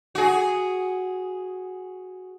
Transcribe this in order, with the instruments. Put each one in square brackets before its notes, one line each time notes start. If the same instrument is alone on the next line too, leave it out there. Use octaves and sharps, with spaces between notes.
[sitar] F#4 G#4